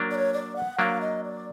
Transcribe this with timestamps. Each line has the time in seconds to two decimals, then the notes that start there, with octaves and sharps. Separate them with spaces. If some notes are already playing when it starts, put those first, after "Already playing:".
Already playing: F#3 A#3 D4
0.11 D5
0.15 C#5
0.34 D5
0.56 F#5
0.79 F#3 A#3 D4 F5
1.01 D#5
1.24 D5